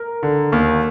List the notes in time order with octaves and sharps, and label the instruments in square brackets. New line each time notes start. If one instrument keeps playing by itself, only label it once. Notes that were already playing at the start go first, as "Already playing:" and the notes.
Already playing: [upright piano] A#4
[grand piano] D3
D#2